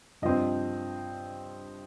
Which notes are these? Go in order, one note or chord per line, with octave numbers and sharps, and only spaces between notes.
G2 F3 C4 D#5